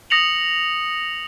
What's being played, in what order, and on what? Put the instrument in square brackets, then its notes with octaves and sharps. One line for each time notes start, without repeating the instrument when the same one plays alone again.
[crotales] D#6 A#6 C#7 F7 F#7